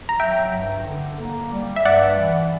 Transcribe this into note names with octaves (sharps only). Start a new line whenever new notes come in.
A#5
F#3 E5 G5
G2
D3
A#3
G3
E5
G2 D5 F#5
E3